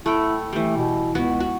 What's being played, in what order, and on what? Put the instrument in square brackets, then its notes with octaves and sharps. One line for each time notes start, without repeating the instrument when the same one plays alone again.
[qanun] A3 F#5 G5 [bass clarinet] E4
[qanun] E3 G3 [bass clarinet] A3
[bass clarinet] B2
[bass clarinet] C#2 [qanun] B3 E4 F#4
[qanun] F#4